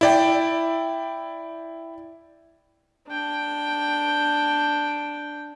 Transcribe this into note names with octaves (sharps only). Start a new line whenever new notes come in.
E4 D5 G5
D4 G5